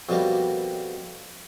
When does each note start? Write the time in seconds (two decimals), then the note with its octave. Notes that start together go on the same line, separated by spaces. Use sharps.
0.09 F2 B2 G3 A#3